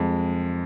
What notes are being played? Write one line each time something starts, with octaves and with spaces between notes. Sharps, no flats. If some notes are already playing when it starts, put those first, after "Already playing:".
Already playing: F2 G#3